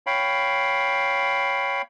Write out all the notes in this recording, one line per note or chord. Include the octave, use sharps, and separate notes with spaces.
C#5 F5 G5 B5